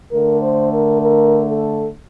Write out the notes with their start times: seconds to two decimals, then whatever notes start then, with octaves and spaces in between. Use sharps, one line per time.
0.11 D3 A3 A#4
0.42 C5
0.72 A#4
1.01 A#4
1.47 A4